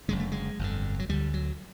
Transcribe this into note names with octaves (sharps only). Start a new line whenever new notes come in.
F#1 F#2 D3 G#3
A3
G#3
G1 F2 D3
F#3
D2 D3 G3
F#3